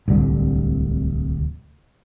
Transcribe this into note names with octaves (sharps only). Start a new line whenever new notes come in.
D1 C2 D3 G3